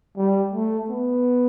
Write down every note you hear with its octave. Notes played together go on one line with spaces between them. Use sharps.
G3
A3
B3